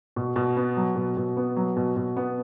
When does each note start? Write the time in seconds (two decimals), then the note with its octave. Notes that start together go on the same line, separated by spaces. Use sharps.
0.16 B2
0.36 B2
0.57 B3
0.77 F#3
0.96 B2
1.17 B2
1.37 B3
1.56 F#3
1.77 B2
1.96 B2
2.17 B3